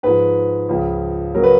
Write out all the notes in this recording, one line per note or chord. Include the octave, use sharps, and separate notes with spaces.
G#2 F3 B4
C#2 C#3 F3
C#3 F#3 A#4
B4